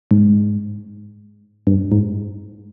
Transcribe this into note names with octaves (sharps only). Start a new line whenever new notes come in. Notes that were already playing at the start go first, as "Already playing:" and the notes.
G#2
G2
G#2